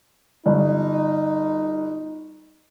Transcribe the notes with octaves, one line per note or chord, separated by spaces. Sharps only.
G1 D#4